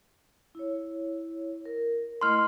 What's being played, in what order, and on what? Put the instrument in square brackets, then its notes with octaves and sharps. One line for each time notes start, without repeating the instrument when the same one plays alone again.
[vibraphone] E4 C#5
A#4
[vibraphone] A3 E4 D#5 [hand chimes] C6 F6